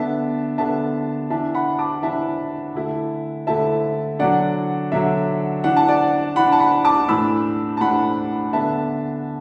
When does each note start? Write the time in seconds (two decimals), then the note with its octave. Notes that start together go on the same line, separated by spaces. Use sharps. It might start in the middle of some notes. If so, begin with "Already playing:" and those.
Already playing: D3 B3 D4 E5 A5
0.58 D3 B3 D4 E5 A5
1.30 E3 D4 E5 A5
1.54 F#5 B5
1.79 A5 D6
2.03 E3 D4 E5 A5
2.75 D3 A3 E4
3.47 D3 A3 E4 E5 A5
4.19 D3 F#3 D4 D5 F#5
4.92 D3 F#3 D4 E5
5.64 E3 D4 F#5
5.76 A5
5.88 D5 F#5
6.36 E3 D4 F#5 B5
6.52 A5
6.60 F#5 B5
6.85 A5 D6
7.08 A2 E3 D4 B5 E6
7.77 A5
7.81 A2 E3 D4 F#5 B5
8.53 D3 B3 D4 E5 A5